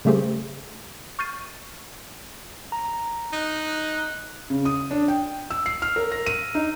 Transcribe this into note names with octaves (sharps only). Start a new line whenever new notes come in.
C#3 G3 A3 G4 G#4 C5
C#6 F6 G6 A6 C7 D#7
A#5
D#4 F#6
C#3
D#6
D4
G5
E6
C7
F6
A#4
A#6
D#7
D#4